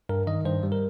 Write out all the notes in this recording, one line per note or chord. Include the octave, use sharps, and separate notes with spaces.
G2 A#4
D#3 D#5
G2 C5
G3
A#4